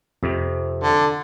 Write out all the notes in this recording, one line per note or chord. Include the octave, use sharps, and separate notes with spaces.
F2 C3
D3